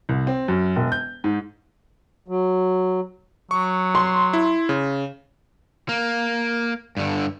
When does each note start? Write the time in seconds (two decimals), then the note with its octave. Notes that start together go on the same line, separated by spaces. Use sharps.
0.09 C2
0.27 C4
0.48 F#2
0.76 E1
0.92 G6
1.24 G#2
2.28 F#3
3.51 F#3 C#6
3.95 C6
4.33 E4
4.69 C#3
5.89 A#3
6.97 G2 D3